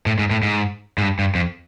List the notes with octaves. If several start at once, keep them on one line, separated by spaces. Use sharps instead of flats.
A2
G#2
A2
G#2
G#2
G2
G2
F2